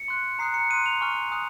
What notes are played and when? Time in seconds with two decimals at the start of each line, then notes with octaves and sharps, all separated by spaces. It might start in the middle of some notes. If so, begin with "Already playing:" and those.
Already playing: C#7
0.08 C6 F#6
0.39 A#5 D#6 F#6 C7
0.54 C#7
0.70 C6 D#6 F#6 D#7
0.86 F7
1.01 G#5 C#6 F6
1.31 G#5 D#6 F#6